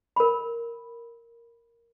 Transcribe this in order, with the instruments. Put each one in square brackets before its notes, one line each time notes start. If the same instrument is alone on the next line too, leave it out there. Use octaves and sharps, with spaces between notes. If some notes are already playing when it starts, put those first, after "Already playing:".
[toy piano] A#4 B5